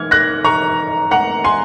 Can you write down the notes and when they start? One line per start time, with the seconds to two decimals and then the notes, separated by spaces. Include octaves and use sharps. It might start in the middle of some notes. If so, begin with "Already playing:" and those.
Already playing: G#2 F6 G#6
0.11 F#6 A#6
0.45 A#5 C#6
1.11 F#5 A#5
1.44 G#5 C6